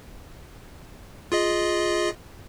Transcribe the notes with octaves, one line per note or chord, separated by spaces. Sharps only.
F4 G#4 D#5